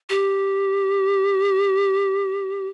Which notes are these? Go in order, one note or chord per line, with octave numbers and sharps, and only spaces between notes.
G4